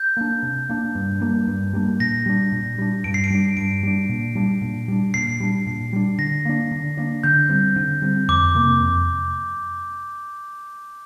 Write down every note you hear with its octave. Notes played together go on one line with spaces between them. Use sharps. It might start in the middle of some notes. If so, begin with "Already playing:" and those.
Already playing: G6
A#3 D4
C3
A#3 D4
G2
G3 A#3 D4
G2
G3 A#3 D4
A#2 A#6
G3 D4
A#2
G3 D4
G2 D7
C7
D7
G3 D4
G2 D7
G3 D4
A#2
G3 D4
A#2
G3 D4
A#2 C7
G3 D4
A#2
G3 D4
D3 A#6
A#3 D4
D3
A#3 D4
D3 G6
G3 C4
D3
G3 C4
F2 D6
C3 A#3
F2